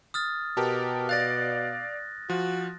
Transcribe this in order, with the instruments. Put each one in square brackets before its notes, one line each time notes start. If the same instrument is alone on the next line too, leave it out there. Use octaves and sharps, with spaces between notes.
[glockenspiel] D#6 F6 A6
[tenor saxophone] B2 [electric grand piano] G4 A#4 A5
[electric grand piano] D5 F5 [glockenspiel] F#6 A6 A#6
[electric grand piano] F3 [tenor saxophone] F#4